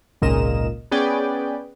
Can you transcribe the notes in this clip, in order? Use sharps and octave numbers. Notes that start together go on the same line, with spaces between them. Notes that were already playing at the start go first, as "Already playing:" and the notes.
G#1 C#2 A#2 A#4 D#5 E7
B3 C#4 G#4 B4 D5 G5